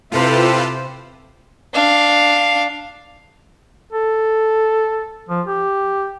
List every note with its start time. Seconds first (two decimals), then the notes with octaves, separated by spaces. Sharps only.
0.12 C3 E4 F4 G4 A4 B4 C5
1.73 D4 F5
3.93 A4
5.29 F3
5.47 G4